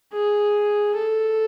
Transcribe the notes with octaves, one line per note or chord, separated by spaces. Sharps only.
G#4
A4